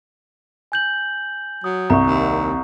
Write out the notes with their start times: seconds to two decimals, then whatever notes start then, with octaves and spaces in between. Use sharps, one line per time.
0.72 G#5 G6 F#7
1.64 F#3 D#6
1.90 C2 A#5 C#6
2.07 D#2